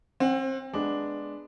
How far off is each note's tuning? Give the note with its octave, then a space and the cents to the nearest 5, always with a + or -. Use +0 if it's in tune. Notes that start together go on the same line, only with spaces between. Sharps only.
C4 +30 F#5 +0
G#3 +0 B3 +0 D4 +0